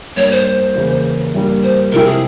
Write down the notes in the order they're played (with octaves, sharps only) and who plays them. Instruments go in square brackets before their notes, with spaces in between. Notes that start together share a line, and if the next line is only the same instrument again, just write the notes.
[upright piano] G2 G3 A#3 [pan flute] C#5
[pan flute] C5
[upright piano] E2 C#3 E3 A#3
G2 G3 A#3
[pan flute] C5
[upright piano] C3 F3 G#3 E4 G4 [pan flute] A#4
[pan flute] G#4